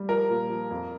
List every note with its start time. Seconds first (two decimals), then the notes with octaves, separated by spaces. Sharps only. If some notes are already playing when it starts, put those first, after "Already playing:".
Already playing: G3
0.09 F3 A#4
0.30 A#2
0.50 F3
0.70 F2